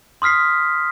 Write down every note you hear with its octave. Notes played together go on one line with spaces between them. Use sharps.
C6 D#6 F6 B6 C7